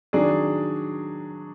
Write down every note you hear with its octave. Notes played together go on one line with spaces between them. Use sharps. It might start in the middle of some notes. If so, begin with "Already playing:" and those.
D#3 F#3 D4 G#4 D5